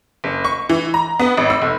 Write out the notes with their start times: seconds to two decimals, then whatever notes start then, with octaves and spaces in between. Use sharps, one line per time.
0.24 F#1
0.45 C#6
0.69 E3
0.94 A#5
1.19 B3
1.37 G#1
1.50 E6
1.62 F1